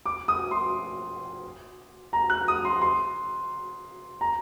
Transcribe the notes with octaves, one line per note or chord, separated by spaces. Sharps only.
D6
D#6
C6
A#5
F#6
D#6
C6
C6
A#5